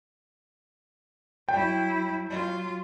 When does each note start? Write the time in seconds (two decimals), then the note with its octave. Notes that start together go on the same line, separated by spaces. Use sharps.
1.49 F#3 E4 G5
2.27 F#3 F4